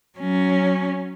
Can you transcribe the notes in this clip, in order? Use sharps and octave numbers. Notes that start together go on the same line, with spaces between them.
F#3 C#4